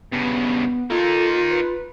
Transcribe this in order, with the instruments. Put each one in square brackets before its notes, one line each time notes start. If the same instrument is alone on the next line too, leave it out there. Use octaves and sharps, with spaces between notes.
[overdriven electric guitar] G2 C#3 [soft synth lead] B3
[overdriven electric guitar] A#3 D#4 [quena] F4 [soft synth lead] A4
[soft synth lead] B4